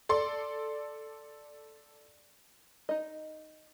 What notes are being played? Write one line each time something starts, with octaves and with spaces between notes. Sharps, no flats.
A4 D5 C6
D#4 D#5